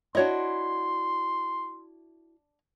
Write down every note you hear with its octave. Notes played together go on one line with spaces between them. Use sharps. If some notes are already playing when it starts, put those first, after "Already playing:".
D4 E4 F#4 C#5 D#5 C6